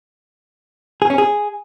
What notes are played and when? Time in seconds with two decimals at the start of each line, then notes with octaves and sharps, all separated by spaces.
1.02 G#4
1.10 C#4
1.18 G#4